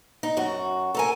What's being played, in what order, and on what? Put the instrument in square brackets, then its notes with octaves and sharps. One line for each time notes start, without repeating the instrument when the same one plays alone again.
[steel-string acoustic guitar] D#4
F#2 F#4
A4 A#4 G#5